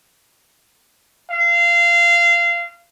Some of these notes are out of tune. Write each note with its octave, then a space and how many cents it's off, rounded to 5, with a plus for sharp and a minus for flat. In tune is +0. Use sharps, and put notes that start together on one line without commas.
F5 -20